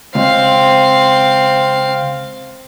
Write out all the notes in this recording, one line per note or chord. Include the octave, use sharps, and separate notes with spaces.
C#2 C4 F5